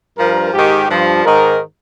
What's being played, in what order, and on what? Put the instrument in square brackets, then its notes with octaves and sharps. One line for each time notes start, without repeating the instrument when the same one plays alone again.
[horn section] G2 F3 A#4
G#2 D#3 G4
G2 F3
G#2 D#3 A#4